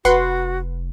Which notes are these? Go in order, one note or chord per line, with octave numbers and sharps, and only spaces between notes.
F1 F#4 B4 F#5 C6